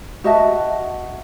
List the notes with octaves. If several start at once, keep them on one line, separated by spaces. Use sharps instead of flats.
F#4 D#5 E5 A5